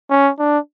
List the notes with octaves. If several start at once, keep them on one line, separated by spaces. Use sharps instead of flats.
C#4
D4